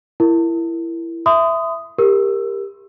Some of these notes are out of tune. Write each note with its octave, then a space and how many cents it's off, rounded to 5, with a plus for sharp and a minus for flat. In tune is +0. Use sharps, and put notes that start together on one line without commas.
E4 +20 A#4 -5
E5 +5 C6 -45 D#6 +0
G4 +20 A#4 +0 E6 +15